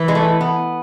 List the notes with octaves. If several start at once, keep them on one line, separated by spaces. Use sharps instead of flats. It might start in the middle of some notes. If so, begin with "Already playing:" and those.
Already playing: E3 B4
G#3
A3
B3